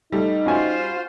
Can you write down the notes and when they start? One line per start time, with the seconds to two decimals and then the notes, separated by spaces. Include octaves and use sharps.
0.12 G3 A3 D#4
0.46 C#4 F4 F#4 C5 G#5